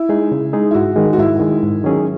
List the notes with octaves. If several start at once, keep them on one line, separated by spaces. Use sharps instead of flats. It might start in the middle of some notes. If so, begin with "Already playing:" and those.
Already playing: E4
G#3 D#4 G#4
C#3
G#3 D#4 G#4
E4
G#2 F#4
D#3 G#3
F#4
G#2 E4
D#3 G#3
G#2
D#3 F#3 C#4 G#4